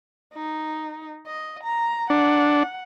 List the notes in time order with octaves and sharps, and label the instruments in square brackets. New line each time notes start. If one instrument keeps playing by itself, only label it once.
[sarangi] D#4
D#5
A#5
[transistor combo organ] D4 [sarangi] F#5